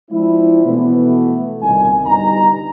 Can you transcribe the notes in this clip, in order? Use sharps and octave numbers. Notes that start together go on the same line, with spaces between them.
F3 G#3 C4 D4 E4
B2 E3 A3 B3
G1 C2 A#2 D#3 G#5
G1 G2 B2 G3 D#4 A#5